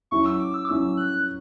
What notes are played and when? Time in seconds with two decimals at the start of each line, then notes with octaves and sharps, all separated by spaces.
0.11 F#3 C#4 E4 C#6
0.26 E6
0.40 D6
0.54 E6
0.65 D6
0.69 F#3 C#4 E4 E6
0.97 F#6